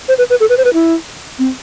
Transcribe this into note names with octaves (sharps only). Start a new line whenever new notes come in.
C5
B4
B4
A4
B4
C5
B4
E4
C4